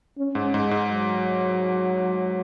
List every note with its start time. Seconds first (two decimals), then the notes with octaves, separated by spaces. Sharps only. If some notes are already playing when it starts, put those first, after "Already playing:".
0.18 C#4
0.35 G#2
0.53 G#2 G#3
0.71 G#2
0.89 F#3